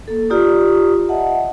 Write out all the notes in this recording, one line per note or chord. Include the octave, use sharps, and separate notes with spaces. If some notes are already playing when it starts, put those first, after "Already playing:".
A#3 A4
F4 G4 D5 A#5 D#6
D#5 E5 F#5 A5